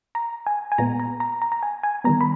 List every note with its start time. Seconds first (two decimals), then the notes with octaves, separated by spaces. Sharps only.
0.15 A#5
0.47 G#5
0.72 G#5
0.78 A#2 G#3 B3 A#5
1.00 A#5
1.20 A#5
1.42 A#5
1.52 A#5
1.63 G#5
1.83 G#5
2.04 D#3 G3 B3 A#5
2.21 B5